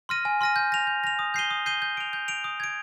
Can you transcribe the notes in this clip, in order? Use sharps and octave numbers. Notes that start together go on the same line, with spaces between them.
C6 F6 A#6 D#7
G#5
C6 F6 A#6 D#7
G6
A#6 F7
G6
A#6 F7
D#6
G6 C7 D#7 G7
D#6
G6 C7 D#7 G7
G6
D7 F7
G6
D7 F7
D#6
G#6 D7